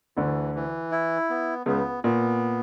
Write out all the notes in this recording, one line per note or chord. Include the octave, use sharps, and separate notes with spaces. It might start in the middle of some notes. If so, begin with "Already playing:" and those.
D2 D3 E3
E3
E4
B3
C#2 C#3 B3
A#2 B3